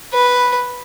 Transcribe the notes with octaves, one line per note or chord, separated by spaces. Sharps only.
B4